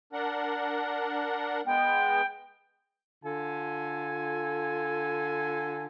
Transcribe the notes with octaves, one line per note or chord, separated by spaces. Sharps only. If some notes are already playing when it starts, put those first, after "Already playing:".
D4 A#4 F#5
G#3 B3 G5
D3 F4 A4 G#5